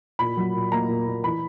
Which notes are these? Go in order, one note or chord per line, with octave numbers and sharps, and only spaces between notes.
A#2 B5
F#3
A#2
A#3 A#5
A#2
A#2
E3 B5